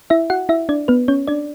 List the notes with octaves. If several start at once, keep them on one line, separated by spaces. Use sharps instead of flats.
E4 E5
F#4 F#5
E4 E5
D4 D5
B3 B4
C#4 C#5
D4 D5